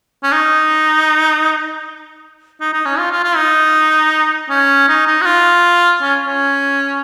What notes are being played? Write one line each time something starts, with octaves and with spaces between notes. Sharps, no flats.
C#4
D#4
D#4
D#4
C#4
F4
F4
F4
D#4
C#4
D#4
D#4
F#4
F4
C#4
C#4